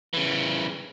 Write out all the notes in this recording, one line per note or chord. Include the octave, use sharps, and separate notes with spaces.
C#3 E3